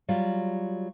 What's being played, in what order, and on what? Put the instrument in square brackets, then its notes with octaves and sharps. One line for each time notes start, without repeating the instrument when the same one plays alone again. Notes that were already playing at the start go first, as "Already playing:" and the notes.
[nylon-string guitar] F#3 G3 F4